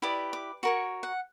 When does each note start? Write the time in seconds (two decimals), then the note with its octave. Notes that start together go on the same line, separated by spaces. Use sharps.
0.02 E4 G4 B4 D5 D#6
0.33 D6
0.63 F#4 A#4 C#5 C#6
1.03 F#5